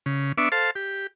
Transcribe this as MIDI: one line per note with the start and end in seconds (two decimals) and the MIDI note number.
0.06 0.32 49
0.38 0.49 59
0.38 0.49 62
0.38 0.49 76
0.38 0.49 85
0.38 0.49 86
0.52 0.71 69
0.52 0.71 72
0.52 0.71 77
0.52 0.71 81
0.75 1.07 67